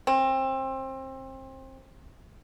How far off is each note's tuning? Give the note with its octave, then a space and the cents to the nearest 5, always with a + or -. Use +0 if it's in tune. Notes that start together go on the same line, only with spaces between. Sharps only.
C4 +25